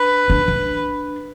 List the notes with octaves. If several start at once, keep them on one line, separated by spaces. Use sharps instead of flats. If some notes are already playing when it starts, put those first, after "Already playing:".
Already playing: D4 B4
D4
D4